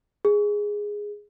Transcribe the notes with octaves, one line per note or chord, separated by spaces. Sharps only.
G#4